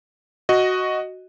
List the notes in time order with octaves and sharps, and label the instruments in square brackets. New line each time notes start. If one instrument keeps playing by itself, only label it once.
[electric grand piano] F#4 D#5